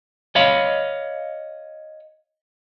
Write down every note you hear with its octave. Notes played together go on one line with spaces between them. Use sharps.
C#5 D#5 F5 B5